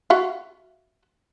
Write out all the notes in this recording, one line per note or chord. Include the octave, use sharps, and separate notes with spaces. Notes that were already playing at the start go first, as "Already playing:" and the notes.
F#4 E5 F5